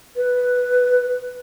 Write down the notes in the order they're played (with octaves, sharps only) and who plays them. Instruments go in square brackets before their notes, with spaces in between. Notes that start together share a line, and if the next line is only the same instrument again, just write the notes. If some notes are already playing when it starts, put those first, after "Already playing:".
[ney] B4